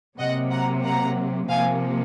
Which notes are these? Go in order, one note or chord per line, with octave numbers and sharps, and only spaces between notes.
C3 F#3 A#3 D#5 F#5
F#5 A#5
F#5 A#5
C3 F3 A#3 F5 G#5